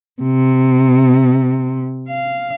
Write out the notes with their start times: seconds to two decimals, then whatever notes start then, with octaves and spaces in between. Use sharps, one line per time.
0.22 C3
2.09 F5